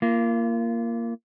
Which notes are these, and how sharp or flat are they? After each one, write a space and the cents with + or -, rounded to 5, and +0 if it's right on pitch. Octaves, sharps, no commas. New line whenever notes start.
A#3 +0 F4 -30